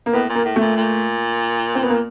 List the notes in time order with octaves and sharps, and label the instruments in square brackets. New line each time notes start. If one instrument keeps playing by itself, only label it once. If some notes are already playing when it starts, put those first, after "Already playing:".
[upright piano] A#3
[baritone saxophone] A2 [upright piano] B3
[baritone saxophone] A#2
[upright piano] A#3
[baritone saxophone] A2
[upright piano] A3
[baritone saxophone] A#2
A#2
[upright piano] C4
B3
A#3